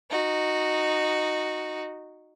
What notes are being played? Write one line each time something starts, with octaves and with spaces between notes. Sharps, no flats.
D#4 F#4